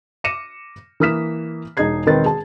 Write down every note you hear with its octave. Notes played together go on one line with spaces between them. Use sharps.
D6 A#6 C#7 D#7 E7
E3 A#3 D#6 F6 B6 E7
E1 D#4 G#4 D#5 G#6 C7
E1 D#3 C4 A#4 B4 A6
G#4 A5